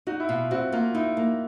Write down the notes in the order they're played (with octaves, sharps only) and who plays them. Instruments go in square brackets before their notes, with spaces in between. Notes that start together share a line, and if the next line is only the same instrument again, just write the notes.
[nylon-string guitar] D#4 [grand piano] F#4
[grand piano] E4
[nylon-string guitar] B2 [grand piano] F4
[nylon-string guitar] C4 [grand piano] F#4
[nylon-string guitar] A#3 [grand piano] F4
[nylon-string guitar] D#4 [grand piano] E4
[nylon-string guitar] A#3